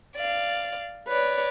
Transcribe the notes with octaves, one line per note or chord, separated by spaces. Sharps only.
D5 F5
B4 C#5 D5